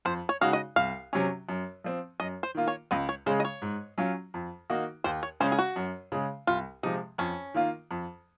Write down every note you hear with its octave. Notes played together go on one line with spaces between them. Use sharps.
F2 C5
C#5
C#3 G#3 D#4 F#4 F5
D#5
C2 F5
C3 F#3 C#4
F#2
F3 C4
F#2 D#5
C5
D#3 A#3 F4
C#5
C#2 D#5
C#5
C#3 G#3 C5
D#5
C#5
G#2
F#3 C#4 F4
F2
D#3 A#3 D#4 F#4
D#2 C5
C#5
C#3 G#3 C#4 C5
G#4
F#4
F#2
C#3 G#3
C2 F4
C3 F3 G#3 D#4
F2 C#4
D#3 A#3 F4
F2